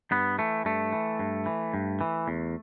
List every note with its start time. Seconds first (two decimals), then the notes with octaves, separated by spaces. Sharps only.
0.11 G2 B3
0.38 E3 A3
0.65 G2 A3
0.93 E3
1.19 G2
1.46 E3
1.74 G2
2.01 E3
2.28 E2